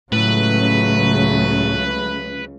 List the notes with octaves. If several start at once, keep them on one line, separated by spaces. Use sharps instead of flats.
C#2 A2 C#3 F#3 A3 B4